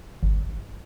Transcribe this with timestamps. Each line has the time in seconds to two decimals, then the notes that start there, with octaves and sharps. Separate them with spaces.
0.23 G1